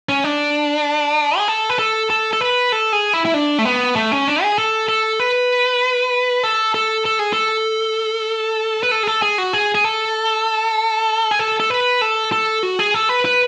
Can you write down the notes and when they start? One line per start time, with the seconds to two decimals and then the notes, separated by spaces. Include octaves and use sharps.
0.09 C#4
0.24 D4
1.38 G#4
1.48 A4
1.70 B4
1.79 A4
2.10 A4
2.33 A4
2.41 B4
2.72 A4
2.92 G#4
3.13 E4
3.25 E4
3.34 D4
3.58 A3
3.65 B3
3.96 A3
4.12 C#4
4.27 D4
4.43 G#4
4.58 A4
4.89 A4
5.20 B4
6.43 A4
6.74 A4
7.05 A4
7.19 G#4
7.33 A4
8.83 B4
8.91 A4
9.03 G#4
9.07 A4
9.22 G#4
9.38 F#4
9.53 G#4
9.75 G#4
9.84 A4
11.31 G#4
11.39 A4
11.60 A4
11.70 B4
12.01 A4
12.32 A4
12.63 F#4
12.79 G#4
12.94 A4
13.09 B4
13.25 B4